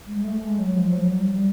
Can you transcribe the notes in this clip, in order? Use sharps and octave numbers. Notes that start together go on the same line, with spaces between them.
G#3
G#3
A3
G#3
F#3
F3
F#3
G3
G3